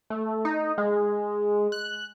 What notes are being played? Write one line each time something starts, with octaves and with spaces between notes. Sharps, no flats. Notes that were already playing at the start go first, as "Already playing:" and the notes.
A3
D#4
G#3
F#6